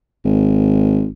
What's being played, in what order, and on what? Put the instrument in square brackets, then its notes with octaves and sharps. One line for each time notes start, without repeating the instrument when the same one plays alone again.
[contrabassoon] G#1